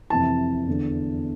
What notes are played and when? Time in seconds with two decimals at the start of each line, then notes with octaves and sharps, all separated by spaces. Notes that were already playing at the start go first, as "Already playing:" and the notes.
0.10 F2 C3 E3 A5
0.67 E2 D3